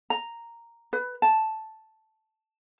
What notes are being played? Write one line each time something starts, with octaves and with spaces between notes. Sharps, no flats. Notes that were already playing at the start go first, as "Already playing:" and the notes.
A#5
B4
A5